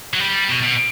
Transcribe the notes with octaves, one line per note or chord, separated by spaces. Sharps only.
F#3
G3
B2
B2